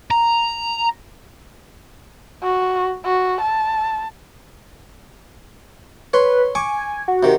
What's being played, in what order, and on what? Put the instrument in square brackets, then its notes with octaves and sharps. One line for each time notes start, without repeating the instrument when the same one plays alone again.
[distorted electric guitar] A#5
[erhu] F#4
F#4
A5
[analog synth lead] B4 [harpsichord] C#5 C6
[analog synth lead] G#5 [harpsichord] C#6 D6
[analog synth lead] F#4
[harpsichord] C3 D#3